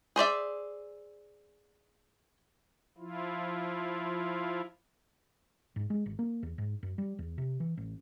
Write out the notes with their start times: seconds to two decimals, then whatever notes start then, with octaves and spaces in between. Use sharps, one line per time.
0.16 G#4 C5 D5 E5
2.98 F3 E4 F4
5.76 G#2
5.90 G#3
6.06 G#1
6.19 A#3
6.43 E2
6.58 G#2
6.83 F#2
6.98 G3
7.19 E2
7.38 C3
7.60 E3
7.77 A1